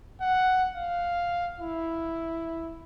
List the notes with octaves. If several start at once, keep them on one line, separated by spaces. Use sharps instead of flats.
F#5
F5
E4